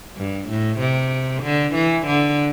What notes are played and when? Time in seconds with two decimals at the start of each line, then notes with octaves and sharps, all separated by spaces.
0.17 G2
0.49 A2
0.80 C3
1.43 D3
1.75 E3
2.07 D3